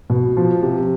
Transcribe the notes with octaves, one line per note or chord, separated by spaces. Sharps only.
B2
F3
C3